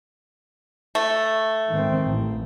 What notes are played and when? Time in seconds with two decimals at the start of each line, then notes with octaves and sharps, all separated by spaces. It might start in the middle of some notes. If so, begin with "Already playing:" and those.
0.95 A3
1.69 G#2 D#3 C4
2.03 A1